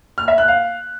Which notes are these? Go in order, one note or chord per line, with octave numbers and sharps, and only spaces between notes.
F6
E5
F#6
F5